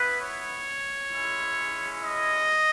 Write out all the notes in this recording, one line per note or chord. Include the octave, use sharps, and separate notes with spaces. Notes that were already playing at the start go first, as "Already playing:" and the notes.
Already playing: B3 E4 B4
C#5
G#3 C#4 E4
D#5